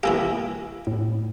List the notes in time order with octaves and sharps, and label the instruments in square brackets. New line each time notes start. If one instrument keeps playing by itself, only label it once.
[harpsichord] E3 A#3 G4 [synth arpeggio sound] F5 G#5 E6
[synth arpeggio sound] A2